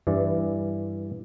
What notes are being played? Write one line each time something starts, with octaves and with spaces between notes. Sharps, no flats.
G2 E3 D5